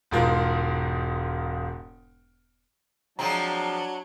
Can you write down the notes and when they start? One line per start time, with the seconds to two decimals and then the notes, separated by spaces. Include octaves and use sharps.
0.11 E1 G#2 F4 A#4
3.19 F3 F#3 G#3 C4 D4 F#4 A5 A#5